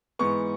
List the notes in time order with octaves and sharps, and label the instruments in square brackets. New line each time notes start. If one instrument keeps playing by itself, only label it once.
[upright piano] G#2 E3 B3 C#6